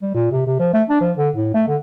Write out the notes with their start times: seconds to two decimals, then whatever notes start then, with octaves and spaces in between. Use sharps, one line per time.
0.02 G3
0.15 A#2
0.32 C3
0.47 C3
0.59 F3
0.74 A3
0.89 D4
1.01 F3
1.17 D3
1.36 A2
1.54 A3
1.68 D3